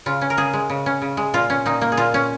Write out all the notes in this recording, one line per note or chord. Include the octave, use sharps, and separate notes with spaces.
C#3 F4
C#4
A#4
C#3 G#4
G#3
C#3
C#4
C#3
G#3
A#2 F4
C#4
A#2 D#4
A#3
G#4
A#2 F4
C#4